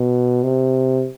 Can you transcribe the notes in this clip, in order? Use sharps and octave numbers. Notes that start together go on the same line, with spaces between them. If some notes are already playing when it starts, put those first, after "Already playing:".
Already playing: B2
C3